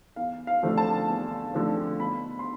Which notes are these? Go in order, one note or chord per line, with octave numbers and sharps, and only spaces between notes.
E2 F5
F5
D3 F3 A3 C4
A5
E2
D3 F3 A3 C4
B2 B5
C6